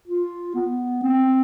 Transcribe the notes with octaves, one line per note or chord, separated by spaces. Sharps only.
F4
B3
C4